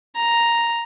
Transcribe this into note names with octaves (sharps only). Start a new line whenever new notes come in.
A#5